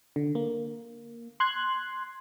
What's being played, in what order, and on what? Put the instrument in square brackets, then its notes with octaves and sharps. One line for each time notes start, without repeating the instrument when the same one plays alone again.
[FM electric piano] D3
A#3
C6 F#6 G#6